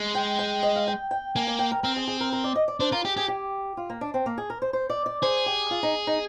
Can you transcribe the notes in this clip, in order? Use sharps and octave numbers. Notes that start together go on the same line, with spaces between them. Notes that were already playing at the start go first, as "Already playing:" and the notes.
Already playing: G#3
G5
G5
D#5
F5
G5
G5
A#3 G#5
G#5
G5
A#4
C4 A#4
G#4
G#4
A#4
A#4
D5
D#5
D5
D4 C5
F4 A#4
G4 G#4
G4 G#4
G4
F4
A#3
D4
C4
A#3
G#4
A#4
C5
C5
D5
D5
G#4 C5
G4
F4
D#4
D#4